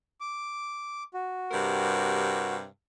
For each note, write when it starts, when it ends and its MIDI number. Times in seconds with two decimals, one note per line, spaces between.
0.20 1.03 86
1.14 2.55 66
1.52 2.67 43
1.52 2.67 48
1.52 2.67 70